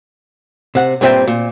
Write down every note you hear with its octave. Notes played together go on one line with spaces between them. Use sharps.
C3 F#5
G2 A#2 B3 C4 E5 G5
A#2